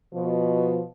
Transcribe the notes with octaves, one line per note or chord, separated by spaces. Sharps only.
B2 F3